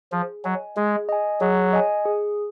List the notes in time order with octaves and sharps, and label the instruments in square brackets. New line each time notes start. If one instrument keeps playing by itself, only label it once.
[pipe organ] F3 [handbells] G#4
[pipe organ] F#3 [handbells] D#5 G#5
[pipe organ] G#3 [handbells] G#4
[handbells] D#5 G#5
[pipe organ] F#3 [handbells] G#4
[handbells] D#5 G#5
G#4